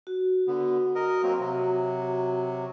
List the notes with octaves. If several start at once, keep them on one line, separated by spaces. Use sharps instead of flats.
F#4
D3 B3
A#4 D#5
F#3 A#3 C4
C3 F#3